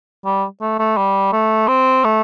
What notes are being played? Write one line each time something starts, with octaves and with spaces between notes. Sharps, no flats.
G3
A3
A3
G3
A3
C4
A3